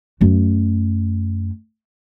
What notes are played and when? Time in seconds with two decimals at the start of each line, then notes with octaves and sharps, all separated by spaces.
0.21 F#2 A3